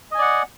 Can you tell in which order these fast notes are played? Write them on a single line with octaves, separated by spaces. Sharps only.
D#5 G#5 D5 F#5